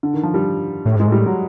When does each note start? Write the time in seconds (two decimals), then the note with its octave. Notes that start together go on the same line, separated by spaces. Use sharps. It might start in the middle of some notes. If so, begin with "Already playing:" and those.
0.03 D3
0.14 D#3
0.23 F3
0.34 G3
0.85 A2
0.96 G#2 G#3
1.07 A2 G3
1.26 F#3